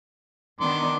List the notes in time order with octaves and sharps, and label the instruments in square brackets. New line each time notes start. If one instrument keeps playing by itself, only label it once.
[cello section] D#3 B3 D4 [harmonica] C6 D6